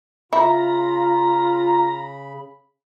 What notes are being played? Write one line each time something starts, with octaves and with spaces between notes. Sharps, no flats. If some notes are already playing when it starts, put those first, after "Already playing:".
C#3 E4 F4 A#5 B5